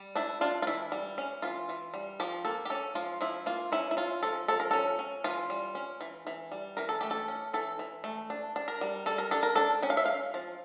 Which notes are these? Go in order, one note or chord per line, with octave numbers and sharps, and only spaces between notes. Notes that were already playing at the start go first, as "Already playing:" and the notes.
Already playing: G3
D4 E4
D4 F4
F4
E3 E4
G3
C#4
E3 F4
E3
G3
F3 G4
A#3 A4
G4
C#4 A4
F3 F4
F3 E4
A#3 F4
C#4 E4
E4
C#4 F4
F3 A4
F3 A4
A#4
C#4 A4
C#4
E3 F4
G3
C#4
E3
E3
G3
E3 A#4
A4
A3 G4
A4
C#4
E3 A4
E3
A3
D4
D4
A#4
G3
G3 A4
A#4
D4 A4
A#4
D4 A4
C#4 G5
F5
E5
C#4 F5
F3